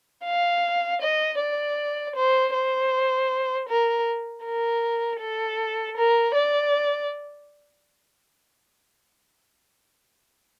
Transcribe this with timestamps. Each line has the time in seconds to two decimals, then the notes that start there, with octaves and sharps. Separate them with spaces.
0.25 F5
1.01 D#5
1.39 D5
2.16 C5
2.54 C5
3.68 A#4
4.44 A#4
5.20 A4
5.97 A#4
6.35 D5